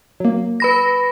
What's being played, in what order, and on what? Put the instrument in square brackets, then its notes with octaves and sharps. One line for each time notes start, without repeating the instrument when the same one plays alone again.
[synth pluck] F#3 A#3
[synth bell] B4 B5 A#6